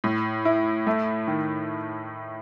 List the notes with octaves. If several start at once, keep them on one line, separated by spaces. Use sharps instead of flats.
A2
E4
A3
D#3